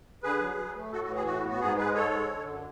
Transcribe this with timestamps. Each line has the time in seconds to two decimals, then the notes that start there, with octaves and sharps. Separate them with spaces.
0.23 D3 G#4 B4
0.40 F#3
0.58 F#3
0.75 A3
0.92 A2 F#4 A4
1.04 F#4
1.09 E3
1.15 G#4
1.26 A2 F#4
1.44 B3 F#4
1.60 G#2 G#4
1.78 G#3 G#4 B4
1.95 G#2 A4 C#5
2.12 G#3
2.29 D3
2.46 F#2